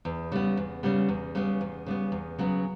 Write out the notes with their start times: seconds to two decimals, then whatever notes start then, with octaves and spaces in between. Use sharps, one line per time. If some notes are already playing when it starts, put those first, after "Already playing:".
0.05 E2
0.32 C#3 G3 B3
0.57 E2
0.83 C#3 G3 B3
1.09 E2
1.35 C#3 G3 B3
1.61 E2
1.86 C#3 G3 B3
2.12 E2
2.39 C#3 F#3 B3